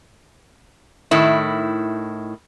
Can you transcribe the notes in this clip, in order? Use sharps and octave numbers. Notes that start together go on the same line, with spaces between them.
A2 D#3 E4